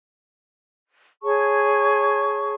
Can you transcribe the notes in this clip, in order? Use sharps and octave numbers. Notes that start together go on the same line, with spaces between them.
G#4 C#5 A5 C#6